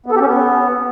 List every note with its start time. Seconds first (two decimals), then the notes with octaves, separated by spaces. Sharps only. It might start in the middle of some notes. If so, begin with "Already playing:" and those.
0.06 B3
0.11 A4
0.16 G4
0.21 C#4
0.26 B3